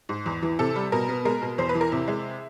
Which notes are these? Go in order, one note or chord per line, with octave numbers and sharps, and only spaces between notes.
G#2
E2
E3
C3 A4
G3
B2 A#4
B3
G#3 A#4
B2
E2 C5
B4
E3
A#4
C3 E4
G#3